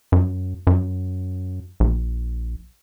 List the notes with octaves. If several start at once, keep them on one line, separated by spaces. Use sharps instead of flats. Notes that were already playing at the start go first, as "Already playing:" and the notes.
F#2
F#2
A#1